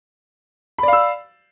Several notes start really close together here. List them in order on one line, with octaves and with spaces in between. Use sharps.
B5 D5 F5 E6